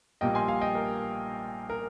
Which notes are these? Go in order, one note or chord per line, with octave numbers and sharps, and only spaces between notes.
A#1 A#2 G3 A#3 D#5 G5
G#5 C6
F5 G#5
D#5 G5
A#4
A#4